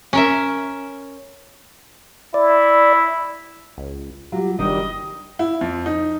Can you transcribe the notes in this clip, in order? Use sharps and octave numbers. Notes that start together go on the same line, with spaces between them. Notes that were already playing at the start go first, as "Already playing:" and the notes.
C#4 A#4 E5
E4 D5
C#2
F#3 G3 F4 G4
F#1 D#3 G3 D4 D#5
E4
F2
D#4